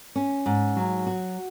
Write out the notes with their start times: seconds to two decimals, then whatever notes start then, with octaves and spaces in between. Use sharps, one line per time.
0.16 C#4
0.46 G#2
0.77 F#3
1.07 F#4